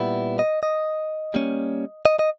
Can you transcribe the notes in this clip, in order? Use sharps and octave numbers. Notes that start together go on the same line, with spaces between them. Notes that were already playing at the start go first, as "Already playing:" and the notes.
Already playing: A#2 G3 B3 E4
D#5
D#5
G3 A#3 C#4
D#5
D#5